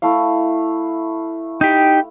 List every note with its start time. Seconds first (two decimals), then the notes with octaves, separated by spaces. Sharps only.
0.02 A3 E4 F5
1.61 D#4 G4 G5